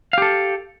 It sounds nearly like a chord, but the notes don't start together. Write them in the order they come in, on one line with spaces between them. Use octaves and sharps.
F5 G4 A4